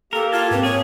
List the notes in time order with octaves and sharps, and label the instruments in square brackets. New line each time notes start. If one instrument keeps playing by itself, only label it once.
[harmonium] A#3 G4 [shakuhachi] A4 [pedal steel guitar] A#4
[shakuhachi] F4 [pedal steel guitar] A4 [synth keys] F6 G#6 A6
[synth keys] G#2 C4 [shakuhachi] B4
[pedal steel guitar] G#4 [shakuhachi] C#5